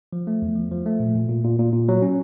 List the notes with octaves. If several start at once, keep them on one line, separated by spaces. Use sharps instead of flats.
F3
A3
E2
F3
F3
A3
A#2
A#2
A#2
A#2
A#2
A#2
F#3
C#4